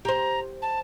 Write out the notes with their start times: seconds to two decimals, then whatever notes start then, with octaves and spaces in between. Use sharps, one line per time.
0.05 G4 C5 A#5
0.62 A5